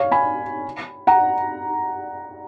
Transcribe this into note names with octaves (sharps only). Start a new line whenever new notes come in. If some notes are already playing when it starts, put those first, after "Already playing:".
Already playing: C#5 F5
G#5 B5
F#5 A#5